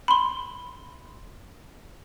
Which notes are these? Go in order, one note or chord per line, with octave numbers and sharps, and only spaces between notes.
B5 C6